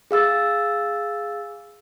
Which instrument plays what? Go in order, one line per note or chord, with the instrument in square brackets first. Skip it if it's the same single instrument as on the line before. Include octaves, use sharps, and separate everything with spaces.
[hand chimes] G#4 F5 E6 A6